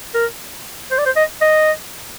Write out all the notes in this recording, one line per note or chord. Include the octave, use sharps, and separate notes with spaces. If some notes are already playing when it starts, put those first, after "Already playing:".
A#4
C5
D5
C5
D#5
D#5